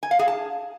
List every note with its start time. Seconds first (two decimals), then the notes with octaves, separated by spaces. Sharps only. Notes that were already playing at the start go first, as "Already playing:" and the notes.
0.03 G#5
0.11 F5
0.19 G#4
0.28 A5